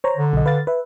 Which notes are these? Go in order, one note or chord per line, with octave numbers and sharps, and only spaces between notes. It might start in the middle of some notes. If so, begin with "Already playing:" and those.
C5 C#5 A#5
D3
B1 D#5
B4 F5 A6
B4 E5